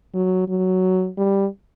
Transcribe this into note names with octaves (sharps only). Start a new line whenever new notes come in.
F#3
F#3
G3